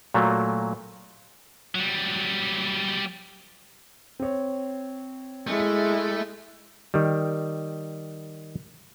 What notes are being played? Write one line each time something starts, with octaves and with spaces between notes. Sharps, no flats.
A#2 F#3 A3 A#3
F#3 G3
C4 C#5
G#3 A3 E4
D#3 G3